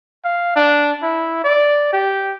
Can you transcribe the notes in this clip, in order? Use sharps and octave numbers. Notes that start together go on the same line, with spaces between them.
F5
D4
E4
D5
G4